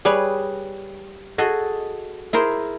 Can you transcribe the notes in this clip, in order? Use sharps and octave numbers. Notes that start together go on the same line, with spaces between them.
G3 G#4 B4 C#5
F#4 G#4 A4 D#5
E4 G#4 A#4 C5